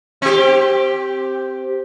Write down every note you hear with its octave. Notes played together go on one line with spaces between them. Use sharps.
C4 G4